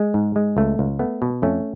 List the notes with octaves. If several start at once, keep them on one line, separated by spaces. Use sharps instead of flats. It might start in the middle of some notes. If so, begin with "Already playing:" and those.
Already playing: G#3
G#2
G#3
C#2 A3
C#2
A3 B3
B2
F2 A3 C#4